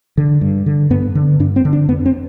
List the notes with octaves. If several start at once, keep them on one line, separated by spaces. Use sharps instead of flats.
D3
G2
D3
G2 B3
D3
G2 D4
C4
D3
D4
F2 B3
C4